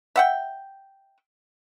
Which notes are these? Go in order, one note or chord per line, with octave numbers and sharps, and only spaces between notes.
E5 F#5 G5